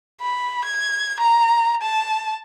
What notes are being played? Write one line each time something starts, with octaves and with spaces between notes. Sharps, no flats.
B5
G#6
A#5
A5